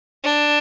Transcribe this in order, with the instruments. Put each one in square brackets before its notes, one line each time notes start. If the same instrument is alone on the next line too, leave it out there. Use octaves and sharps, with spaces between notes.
[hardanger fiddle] D4